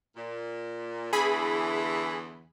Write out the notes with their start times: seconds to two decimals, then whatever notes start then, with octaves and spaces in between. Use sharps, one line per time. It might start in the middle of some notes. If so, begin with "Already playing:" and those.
0.17 A#2
1.13 E2 D3 E3 G#4 B5